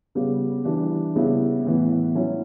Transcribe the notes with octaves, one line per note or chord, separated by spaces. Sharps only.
C#3 G3 B3
E3 G3 D4
C#3 G3 B3 E4
A2 E3 B3
F#3 C#4 E4